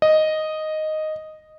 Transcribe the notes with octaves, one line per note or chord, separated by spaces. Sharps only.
D#5